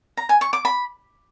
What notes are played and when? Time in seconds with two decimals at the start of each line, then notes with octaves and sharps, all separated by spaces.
0.17 A#5
0.29 G#5
0.41 C#6
0.53 D6
0.65 B5